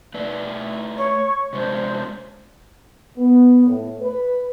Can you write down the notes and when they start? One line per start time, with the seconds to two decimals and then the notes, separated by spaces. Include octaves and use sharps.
0.14 A3 B4 D5
0.97 C#5
1.53 C3 G#3 D4 C5
3.18 B3
3.66 A2
4.01 B4